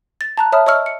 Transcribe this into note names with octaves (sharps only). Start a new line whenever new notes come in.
A6
A5 A#5 F#6
C#5 E5 A5 B5 D#6 F6
C#5 D#5 C#6 E6 F6
C#7